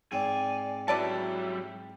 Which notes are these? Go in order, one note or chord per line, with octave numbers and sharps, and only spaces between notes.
G#2 C4 D5 G#5
F#3 G3 E4 B4 D5 A5